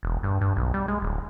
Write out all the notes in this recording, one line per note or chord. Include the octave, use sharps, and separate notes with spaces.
E1
G2
G2
B1
G3
G#3
D1